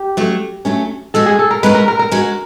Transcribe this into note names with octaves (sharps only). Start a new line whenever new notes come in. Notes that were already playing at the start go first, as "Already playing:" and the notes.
Already playing: G4
F#3 A3 C#4
F#3 A3 C#4
G#3 C#4 F#4 A4
G#4
A4
A#4
G#3 C#4 F#4 B4
A#4
A#4
A#4
G#3 C#4 F#4